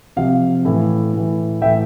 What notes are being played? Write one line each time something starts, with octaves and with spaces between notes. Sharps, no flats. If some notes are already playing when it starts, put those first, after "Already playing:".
C3 F3 F5
A2 E3
A2 E3
A2 E3 E5 G5